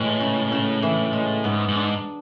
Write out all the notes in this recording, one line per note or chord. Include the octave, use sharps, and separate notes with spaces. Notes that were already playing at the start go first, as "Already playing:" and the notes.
Already playing: A2 E3 G#3
C#3
C#3
E3
G#3
G#2 B3
G#2
D4